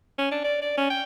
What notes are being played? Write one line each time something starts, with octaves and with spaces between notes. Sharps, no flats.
C#4
D4
D5
D5
C#4
G5